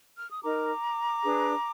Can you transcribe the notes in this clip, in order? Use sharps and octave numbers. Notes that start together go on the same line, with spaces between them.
F6
D#6
D#4 A#4 A#5 D6
D4 G#4 B4